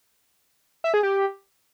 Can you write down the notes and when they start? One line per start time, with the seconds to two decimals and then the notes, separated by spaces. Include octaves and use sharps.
0.84 E5
0.94 G#4
1.03 G4